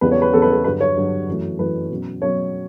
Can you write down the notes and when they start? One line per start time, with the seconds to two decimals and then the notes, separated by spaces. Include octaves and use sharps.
0.01 E2 C#3 G3 B3 B4
0.11 C#5
0.22 B4
0.33 E2 C#3 G3 B3 A4
0.42 B4
0.52 A4
0.64 G2 D3 F#3 B4
0.81 C#5
0.96 G2 D3 F#3
1.28 F#2 E3 A3
1.59 F#2 E3 A3 B4
1.90 B2 F#3 C#4
2.22 B2 F#3 C#4 C#5